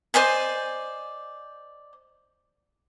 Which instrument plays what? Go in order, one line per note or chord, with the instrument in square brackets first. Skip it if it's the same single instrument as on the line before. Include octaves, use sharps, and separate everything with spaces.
[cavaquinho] C5 D5 D#5 G#5